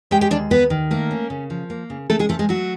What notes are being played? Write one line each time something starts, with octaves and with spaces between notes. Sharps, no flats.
G#3 G4 G5
G4 G5
D#2 D4 D5
D#2 B3 B4
D#3
A3 A#3 A#4
C#4
C#3
F3
A#3
C#3
C#3 A3 A4
G#3 G#4
F3 A3 A4
G#3 G#4
F#3 A3 F#4